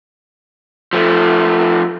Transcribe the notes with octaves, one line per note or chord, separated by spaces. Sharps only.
F3 A3